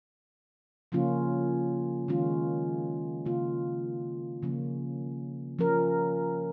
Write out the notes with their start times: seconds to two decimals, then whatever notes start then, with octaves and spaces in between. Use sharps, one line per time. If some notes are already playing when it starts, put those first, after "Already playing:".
0.92 C#3 F3 A#3 C#4 F4
2.08 D#3 G#3 C#4 F4
3.26 C#3 A#3 F4
4.43 C#3 F3 A#3 C#4
5.59 F3 C#4 A#4